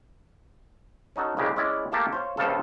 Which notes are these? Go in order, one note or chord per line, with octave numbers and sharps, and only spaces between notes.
C#4 D#4 F#4 A4
C2 C#3 G#3 G4
G#3 C#4 E4 D5
A3 A#3 G4 A4 E5 F5
C5 C#5 F5
A#1 G2 C#3 F3 F4 A4